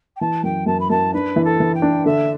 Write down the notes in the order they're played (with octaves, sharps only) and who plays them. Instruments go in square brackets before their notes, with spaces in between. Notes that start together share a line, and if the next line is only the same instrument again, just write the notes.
[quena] G5
[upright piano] E3 [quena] A5
[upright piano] F#2 [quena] G5
[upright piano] F#2 [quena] A5
[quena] B5
[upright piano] F#2 [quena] A5
[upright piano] D4 [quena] B4
[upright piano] E3
[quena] A4
[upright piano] E3
[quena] G5
[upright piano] D4
[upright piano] D3 [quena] E5